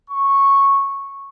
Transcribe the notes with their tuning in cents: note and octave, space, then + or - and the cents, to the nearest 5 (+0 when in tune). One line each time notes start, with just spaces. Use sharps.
C#6 -10